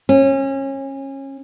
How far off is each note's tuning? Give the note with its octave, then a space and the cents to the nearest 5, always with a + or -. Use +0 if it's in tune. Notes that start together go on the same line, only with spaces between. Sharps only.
C#4 -30